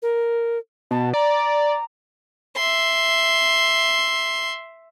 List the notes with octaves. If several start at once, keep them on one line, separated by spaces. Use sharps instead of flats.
A#4
B2 A5
D5 A#5
E5 C6